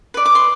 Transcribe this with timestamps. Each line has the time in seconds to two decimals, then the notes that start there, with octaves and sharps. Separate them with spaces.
0.14 B4 D5
0.26 D6
0.35 C6